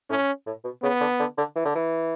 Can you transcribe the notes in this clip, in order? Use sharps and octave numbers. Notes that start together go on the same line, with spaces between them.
A2 C#4
A2
B2
C#3 B3
D3
D3
D3
E3
D3
E3